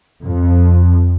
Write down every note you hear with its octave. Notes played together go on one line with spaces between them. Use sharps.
F2